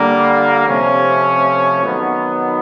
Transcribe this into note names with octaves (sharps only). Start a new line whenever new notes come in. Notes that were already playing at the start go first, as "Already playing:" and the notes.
Already playing: D3 G3 A#3
C3 F3 A3 C#4
D#3 F#3 B3